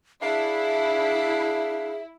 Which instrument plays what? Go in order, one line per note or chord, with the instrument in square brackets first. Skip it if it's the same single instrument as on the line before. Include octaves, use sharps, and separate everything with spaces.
[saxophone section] D4 F5 [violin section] E4 [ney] G#4 [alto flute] E5